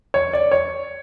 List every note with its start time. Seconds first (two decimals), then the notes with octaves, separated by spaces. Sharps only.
0.14 C#5
0.33 D5
0.52 C#5